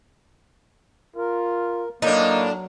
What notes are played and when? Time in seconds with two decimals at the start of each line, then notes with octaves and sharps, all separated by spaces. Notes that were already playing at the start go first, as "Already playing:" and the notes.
1.16 F4 A#4
2.02 A2 F#3 A#3 D4 D#4